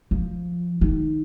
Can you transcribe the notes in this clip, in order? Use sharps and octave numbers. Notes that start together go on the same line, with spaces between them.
F3
D#3